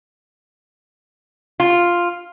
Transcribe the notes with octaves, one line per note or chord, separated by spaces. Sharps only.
F4